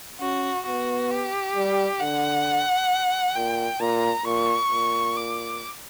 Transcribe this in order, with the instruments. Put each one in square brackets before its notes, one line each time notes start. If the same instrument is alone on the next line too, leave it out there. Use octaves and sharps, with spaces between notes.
[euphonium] C#4 [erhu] F#4
[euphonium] B3 [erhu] F#4
[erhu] G4
[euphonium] G3
[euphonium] D3 [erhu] F#5
[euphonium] A#2 [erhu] G5
[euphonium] A#2 [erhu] A#5
[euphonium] A#2 [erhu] C#6
[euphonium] A#2
[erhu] D6